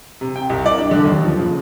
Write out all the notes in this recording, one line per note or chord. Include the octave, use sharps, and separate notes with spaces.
C3
G5
C2
D5
D4
D3
D#2
F3
C#3